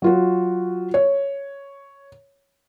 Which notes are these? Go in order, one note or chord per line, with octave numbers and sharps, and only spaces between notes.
F#3 F4 F#4
C#5